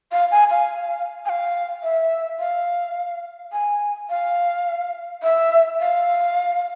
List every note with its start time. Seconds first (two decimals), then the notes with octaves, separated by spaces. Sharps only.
0.12 F5
0.31 G#5
0.50 F5
1.25 G#5
1.29 F5
1.83 E5
2.39 F5
3.52 G#5
4.10 F5
5.23 E5
5.80 F5